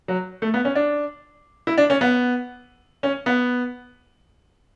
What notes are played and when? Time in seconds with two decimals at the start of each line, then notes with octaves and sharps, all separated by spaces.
0.08 F#3
0.42 A3
0.54 B3
0.65 C#4
0.75 D4
1.67 E4
1.78 D4
1.90 C#4
2.01 B3
3.03 C#4
3.26 B3